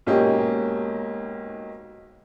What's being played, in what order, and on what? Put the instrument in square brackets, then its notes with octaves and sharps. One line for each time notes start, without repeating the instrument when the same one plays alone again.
[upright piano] B1 G#2 A#3 C#4 G4 D#5